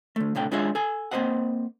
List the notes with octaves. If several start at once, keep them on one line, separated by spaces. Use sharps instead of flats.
D3 A3
C2 A2 D3 G5
G#3 D4 F4 G#4 C#5 E5
A4 G#5
A#3 C4 D4 C5 D#5 F#5